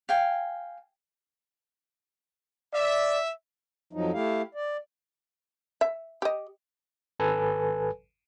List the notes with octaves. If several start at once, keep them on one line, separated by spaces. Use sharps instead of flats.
F5 G5 G#5
D5 E5
F2 F3 F#3 D#4
A3 E4 G4 F5
D5
E5
G4 D#5
G#1 A4 B4 G#5